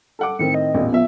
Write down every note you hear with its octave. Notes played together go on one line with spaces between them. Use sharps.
A4 F#5 D6
A2 D#3 C4 C#7
D#5
A1 E2 A#2
F3 B3 E5